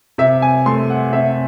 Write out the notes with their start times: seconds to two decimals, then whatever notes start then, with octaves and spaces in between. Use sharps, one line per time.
0.18 C3 E5
0.42 G#5
0.66 A3 C6
0.90 F#5
1.13 C3 E5